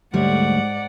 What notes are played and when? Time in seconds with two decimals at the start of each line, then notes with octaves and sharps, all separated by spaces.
0.14 D2 G#2 G3 C#5 D5 F#5